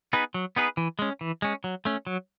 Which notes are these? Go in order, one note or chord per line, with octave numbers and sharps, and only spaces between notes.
B3 D#4 G#4 B4
F#3
B3 D#4 G#4 B4
E3
G#3 C#4
E3
G#3 C#4
F#3
A3 C#4
F#3